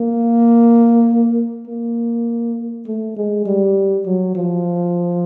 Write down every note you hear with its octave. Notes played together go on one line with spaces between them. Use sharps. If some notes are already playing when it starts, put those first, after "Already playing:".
Already playing: A#3
A#3
A3
G#3
G3
F#3
F3